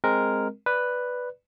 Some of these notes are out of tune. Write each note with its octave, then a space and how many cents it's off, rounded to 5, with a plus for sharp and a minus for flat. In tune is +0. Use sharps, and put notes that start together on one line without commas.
G#3 +0 C4 +0 A#4 +0
B4 +0 D5 +0